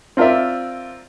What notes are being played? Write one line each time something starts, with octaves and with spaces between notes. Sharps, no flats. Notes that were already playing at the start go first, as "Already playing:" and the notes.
C4 F4 A#4 D5 E5